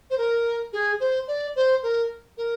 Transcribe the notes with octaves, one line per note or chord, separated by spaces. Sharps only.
C5
A#4
G#4
C5
D5
C5
A#4
A#4